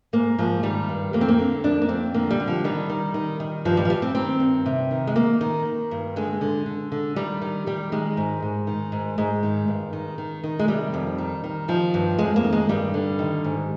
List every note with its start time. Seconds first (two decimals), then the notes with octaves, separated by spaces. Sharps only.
0.13 G#2 A#3
0.38 G#2 F3
0.63 D#3 G3
0.89 G2
1.13 F2 A#3
1.21 C4
1.28 A#3
1.39 D3
1.64 F2 D4
1.82 A#3
1.88 F2 C4
2.14 D3 A#3
2.31 G3
2.40 D3
2.48 F3
2.64 D#3 G3
2.90 D#3
3.14 D#3
3.40 D#3
3.65 G2 F3
3.77 G3
3.85 F3
3.90 G2 G3
4.02 C4
4.15 D#3 C4
4.40 G2
4.66 C3
4.91 D#3
5.07 G#3
5.15 D#3 A#3
5.41 D#3
5.65 D#3
5.91 G2
6.16 D3 G#3
6.41 D3
6.66 D3
6.92 D3
7.16 D#3 G3
7.42 D#3
7.66 D#3 G3
7.92 D#3 G#3
8.17 G#2
8.42 G#2
8.67 D#3
8.92 G#2
9.18 G#2 G#3
9.43 D#3
9.68 G2
9.93 D#3
10.18 D#3
10.44 D#3
10.59 G#3
10.68 C3 G3
10.94 F2
11.18 D#3
11.44 D#3
11.68 D#3 F3
11.94 G2
12.19 F2 G#3
12.36 A#3
12.44 D#3
12.53 G#3
12.69 G2 G3
12.94 D3
13.19 D#3
13.44 G#2